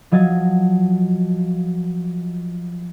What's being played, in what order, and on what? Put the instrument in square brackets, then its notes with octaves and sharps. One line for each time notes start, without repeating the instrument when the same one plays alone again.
[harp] F3 F#3 D#5 G#6 A6